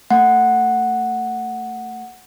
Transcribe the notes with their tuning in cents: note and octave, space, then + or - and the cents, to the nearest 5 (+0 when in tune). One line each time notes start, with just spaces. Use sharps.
A3 +25 F#5 -5